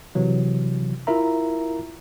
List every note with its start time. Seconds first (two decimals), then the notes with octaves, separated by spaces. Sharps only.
0.15 C3 E3 F#3
1.07 E4 F4 A#4 E5 A#5